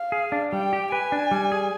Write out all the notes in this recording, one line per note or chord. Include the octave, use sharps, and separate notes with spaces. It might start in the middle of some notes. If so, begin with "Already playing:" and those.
Already playing: F5
G#4
D4
G3 G5
G4
B4 G#5
D4
G3
G#4